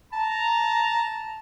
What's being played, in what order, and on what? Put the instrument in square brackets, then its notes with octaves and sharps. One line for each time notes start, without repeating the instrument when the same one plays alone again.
[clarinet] A5 [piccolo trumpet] A#5